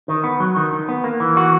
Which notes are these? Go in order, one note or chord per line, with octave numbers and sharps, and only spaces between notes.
D#3
B3
F#3
D#3
D#3
B3
A#3
E3
F#4